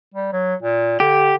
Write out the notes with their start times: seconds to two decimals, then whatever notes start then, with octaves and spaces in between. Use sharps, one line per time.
0.14 G3
0.33 F#3
0.63 A#2
1.00 D3 G4